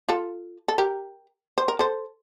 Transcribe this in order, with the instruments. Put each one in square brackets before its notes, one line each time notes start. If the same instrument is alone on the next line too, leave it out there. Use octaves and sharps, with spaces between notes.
[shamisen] F4 A4
A4
G4 A#4
C5
A#4
A4 C5